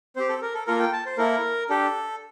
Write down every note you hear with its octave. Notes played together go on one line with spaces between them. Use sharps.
C4 G4 C5
A4
A#4
A4
A#3 F4 A4 A#4
G5
A5
C5
A#3 E4 A4 A#4
D4 G4 A4